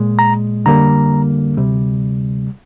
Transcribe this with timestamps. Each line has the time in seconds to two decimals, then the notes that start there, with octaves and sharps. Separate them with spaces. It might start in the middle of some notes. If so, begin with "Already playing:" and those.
Already playing: A#2 G#3
0.19 A#5
0.65 F2 D3 G3 A#3 A#5
1.57 D2 C3 G3